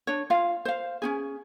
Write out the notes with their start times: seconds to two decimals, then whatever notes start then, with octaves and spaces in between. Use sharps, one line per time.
0.07 D4 C#5
0.30 F4 F5
0.65 C5 F5
1.02 C#4 D#4 G#4